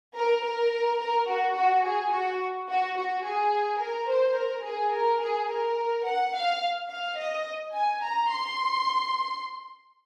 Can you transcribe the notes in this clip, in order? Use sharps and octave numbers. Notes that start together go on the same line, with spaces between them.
A#4
A#4
A#4
F#4
F#4
G#4
F#4
F#4
F#4
G#4
A#4
C5
A#4
G#4
A#4
G#4
A#4
F#5
F5
F5
D#5
G#5
A#5
C6